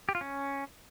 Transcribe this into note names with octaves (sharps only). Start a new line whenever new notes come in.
G4
F4
C#4